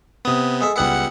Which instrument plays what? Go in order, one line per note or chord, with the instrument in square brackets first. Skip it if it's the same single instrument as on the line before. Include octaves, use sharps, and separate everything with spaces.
[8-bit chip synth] C3 B3 [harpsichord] D#6
[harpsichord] G#3 A4 E5
[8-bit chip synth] C#2 F#5 C#7 [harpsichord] G3 B3 E4